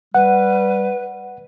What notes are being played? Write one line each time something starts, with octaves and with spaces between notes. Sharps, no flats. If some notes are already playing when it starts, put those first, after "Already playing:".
G3 B4 F#5